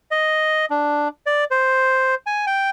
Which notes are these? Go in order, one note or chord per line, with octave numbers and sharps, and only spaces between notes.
D#5
D4
D5
C5
G#5
G5